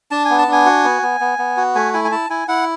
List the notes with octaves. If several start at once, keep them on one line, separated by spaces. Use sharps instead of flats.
D4 A5
B3 G#5
A5
D4 G#5
F#4
B3
B3
B3
B3
F#4
A3 G#5
E4 G#5
G#5
E4 A5
E4 G#5
E4 F#5